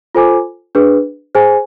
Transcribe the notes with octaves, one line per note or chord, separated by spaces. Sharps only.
F4 A4 C5 G#5 D6
D4 G#4 B4
G#4 C5 G#5